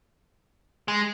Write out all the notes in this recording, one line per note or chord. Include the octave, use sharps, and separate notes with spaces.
G#3